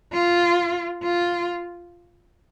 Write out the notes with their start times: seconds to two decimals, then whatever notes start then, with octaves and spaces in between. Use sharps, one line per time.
0.13 F4
1.03 F4